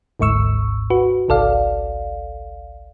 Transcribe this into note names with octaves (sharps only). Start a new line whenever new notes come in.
G#1 D2 G#2 C#6 E6
F#4 B4
G#1 C#2 A4 D5 F5